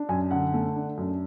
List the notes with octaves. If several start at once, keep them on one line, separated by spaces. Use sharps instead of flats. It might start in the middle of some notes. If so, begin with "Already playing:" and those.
Already playing: D4
F#2 G#5
D3 F#5
A3
D4
F#2